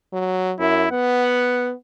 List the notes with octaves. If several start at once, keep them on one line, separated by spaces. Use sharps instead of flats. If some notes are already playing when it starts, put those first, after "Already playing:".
F#3
F#2 E4
B3 F#5